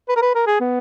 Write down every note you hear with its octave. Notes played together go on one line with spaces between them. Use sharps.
B4
A#4
B4
A#4
G#4
B3